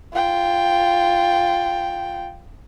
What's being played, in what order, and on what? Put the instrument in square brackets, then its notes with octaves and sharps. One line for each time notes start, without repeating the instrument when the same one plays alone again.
[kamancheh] F4 G5